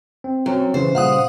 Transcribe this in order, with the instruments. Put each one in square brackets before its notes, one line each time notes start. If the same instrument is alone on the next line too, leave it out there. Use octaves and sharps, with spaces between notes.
[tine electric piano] C4
[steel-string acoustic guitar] F#2 [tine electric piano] F#3 C4
[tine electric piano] C#3 E3 [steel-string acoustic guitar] C5
[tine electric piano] A#2 C#3 G3 [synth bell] F5 F#5 D#6